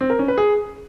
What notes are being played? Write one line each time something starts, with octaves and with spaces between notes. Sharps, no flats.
C4
A#4
C#4
B4
G#4